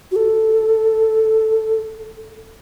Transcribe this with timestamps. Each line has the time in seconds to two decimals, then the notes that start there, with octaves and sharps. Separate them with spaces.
0.11 F#4
0.16 A4